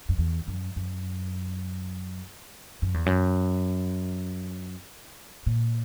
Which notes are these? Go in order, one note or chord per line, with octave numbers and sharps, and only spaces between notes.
F#2
E2
F#2
F#2
F#2
E2
F#2
A#2